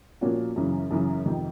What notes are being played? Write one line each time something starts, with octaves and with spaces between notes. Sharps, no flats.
A#2 F3 A#3 C#4 F#4
F#2 C#3 E3
F#2 C#3 E3
F2 C3 D#3